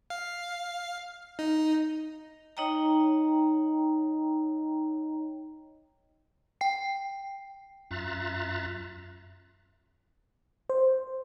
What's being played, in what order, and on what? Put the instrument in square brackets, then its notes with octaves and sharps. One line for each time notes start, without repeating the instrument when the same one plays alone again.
[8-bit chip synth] F5
D#4
[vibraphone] D#4 C#5 D#5 G5 A#5
[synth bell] G5 C7
[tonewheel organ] F#2 F4 E5 A#5 F#6 A6
[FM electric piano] C5